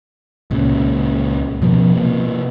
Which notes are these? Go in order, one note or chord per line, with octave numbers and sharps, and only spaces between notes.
C#2 A#2 C#3
B2 F3 B3
C3 A#3